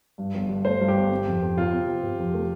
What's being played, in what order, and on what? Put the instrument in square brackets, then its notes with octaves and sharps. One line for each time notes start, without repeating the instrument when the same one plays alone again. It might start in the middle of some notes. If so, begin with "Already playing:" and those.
[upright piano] G2
G1
G2
[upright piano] A3 [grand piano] C5
[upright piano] G2
[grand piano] G4
[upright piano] G1
C4
F2
F2
[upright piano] C3 [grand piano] F4
[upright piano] C4
C4
C3
F2
A3